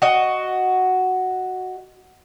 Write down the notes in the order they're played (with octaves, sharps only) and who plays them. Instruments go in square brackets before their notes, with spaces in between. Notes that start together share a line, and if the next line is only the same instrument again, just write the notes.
[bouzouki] F#4 D#5